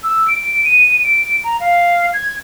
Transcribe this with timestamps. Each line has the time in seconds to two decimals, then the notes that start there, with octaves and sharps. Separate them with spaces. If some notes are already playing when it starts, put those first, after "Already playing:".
0.04 E6
0.28 D7
0.64 D#7
1.04 D7
1.44 A#5
1.60 F5
2.14 G#6